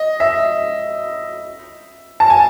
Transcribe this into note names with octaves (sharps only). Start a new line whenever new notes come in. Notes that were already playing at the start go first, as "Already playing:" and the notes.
Already playing: D#5
E5
A5
G#5